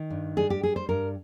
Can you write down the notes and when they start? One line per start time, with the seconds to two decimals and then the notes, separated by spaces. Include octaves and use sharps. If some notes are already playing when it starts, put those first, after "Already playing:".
Already playing: D#3
0.10 G2
0.36 G3 G#4
0.50 G4
0.63 G3 G#4
0.76 C5
0.89 G2 A#4